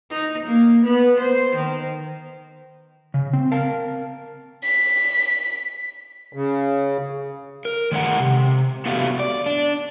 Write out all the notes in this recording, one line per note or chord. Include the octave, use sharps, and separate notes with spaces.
D#4
A#3
B3
C5
D#3
C#3
C4
A#4 F5 A5
B6
C#3
A#4
D#3 G#3 A4 C5 F#5 A#5
C3
B3 F#4 G4 A4 E5 F5
D5
D4